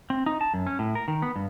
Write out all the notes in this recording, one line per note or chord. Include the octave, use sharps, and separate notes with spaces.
C4
D#4
A5
F#2
C#4
A2
A#4
D#3
B3
G2